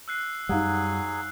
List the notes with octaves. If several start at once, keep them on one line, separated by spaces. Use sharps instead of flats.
E6 F#6 C7
F#2 F#3 G3 D#4 G#4 F5 F#5